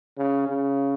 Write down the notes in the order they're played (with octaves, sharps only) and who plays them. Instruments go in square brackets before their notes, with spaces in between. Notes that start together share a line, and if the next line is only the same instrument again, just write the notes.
[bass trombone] C#3
C#3